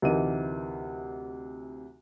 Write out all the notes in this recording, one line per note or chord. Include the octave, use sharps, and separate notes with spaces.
D2 C3 E3 D#4 A#4 D#7